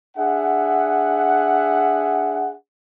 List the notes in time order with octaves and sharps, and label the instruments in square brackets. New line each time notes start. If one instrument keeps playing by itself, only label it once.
[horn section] D4 G#4 E5 F#5